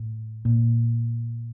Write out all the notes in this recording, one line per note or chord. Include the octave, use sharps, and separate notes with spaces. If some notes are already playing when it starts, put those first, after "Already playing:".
Already playing: A2
A#2